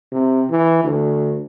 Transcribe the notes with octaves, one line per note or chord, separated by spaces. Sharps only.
C3
E3
D2